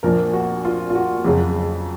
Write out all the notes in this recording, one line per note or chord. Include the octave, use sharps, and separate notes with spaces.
A#1 A#2 F3 A#4
F#4
F4
F4
F#4
F2 C#3 F#3 G#4